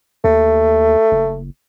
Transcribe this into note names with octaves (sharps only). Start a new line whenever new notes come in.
D#2 A3
F#1